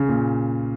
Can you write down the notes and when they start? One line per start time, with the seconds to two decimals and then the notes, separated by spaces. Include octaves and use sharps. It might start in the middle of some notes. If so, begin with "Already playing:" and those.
Already playing: C#3
0.09 A#2